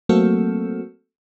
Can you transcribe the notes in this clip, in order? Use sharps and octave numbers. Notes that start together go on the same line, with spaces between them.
F#3 A3 A#3 C4 F#4 A4